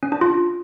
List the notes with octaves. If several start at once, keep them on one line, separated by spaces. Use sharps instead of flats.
C#4
D4
F4